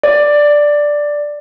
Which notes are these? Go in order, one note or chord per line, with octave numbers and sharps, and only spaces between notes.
D5